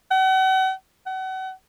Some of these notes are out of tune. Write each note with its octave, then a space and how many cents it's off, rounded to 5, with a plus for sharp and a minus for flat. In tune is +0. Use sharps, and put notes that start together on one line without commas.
F#5 +40
F#5 +35